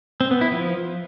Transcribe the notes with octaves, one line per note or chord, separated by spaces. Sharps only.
C4
B3
E4
F3